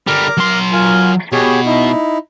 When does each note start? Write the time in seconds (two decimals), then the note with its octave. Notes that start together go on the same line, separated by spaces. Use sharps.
0.07 D3 G3 A#4 A#5 D6
0.37 F#3 C6
0.73 F4 A#4 G#5
1.32 B2 G4 G#4 C#5
1.66 D#4 E4